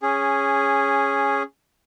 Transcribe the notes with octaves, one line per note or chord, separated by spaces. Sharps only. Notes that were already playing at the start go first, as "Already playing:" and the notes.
C#4 G#4